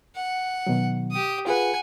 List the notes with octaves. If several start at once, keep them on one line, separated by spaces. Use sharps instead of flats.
F#5
B2 D#3 F#3
G4 D#6
F4 G#4 B4 F#5 G#5